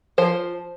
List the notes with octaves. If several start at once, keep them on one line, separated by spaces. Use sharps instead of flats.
F3 C5